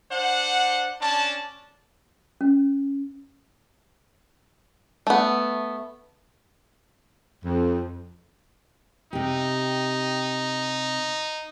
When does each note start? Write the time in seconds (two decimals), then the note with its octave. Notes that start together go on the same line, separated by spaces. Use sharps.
0.12 D4 C5 F#5
1.02 C#4 D4 A5
2.41 C#4
5.07 A3 B3
7.44 F2
9.13 C3 D#4 G4